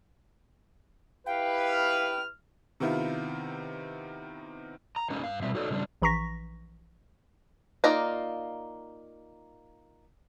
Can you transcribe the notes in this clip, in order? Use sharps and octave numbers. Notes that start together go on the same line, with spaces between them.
E4 G4 B4 F5 G5
F6
C3 D#3 B3 E4 F4
A#5
G#3 A#3 C#4 D#4
G2 F5
B2 G3 C4 E5
D#4 F#4 A4 C#5 D5
C#3 F3 G3 C#4 D4
A#1 E3 A#5 C#6 A#6 B6
A#3 D#4 F4 D5 A#5